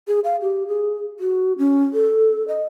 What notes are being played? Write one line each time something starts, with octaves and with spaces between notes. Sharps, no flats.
G#4
F5
G4
G#4
F#4
C#4
A4
D#5